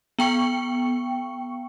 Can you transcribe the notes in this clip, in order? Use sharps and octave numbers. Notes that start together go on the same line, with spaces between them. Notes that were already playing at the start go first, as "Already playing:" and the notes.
B3 G5 C#6 C#7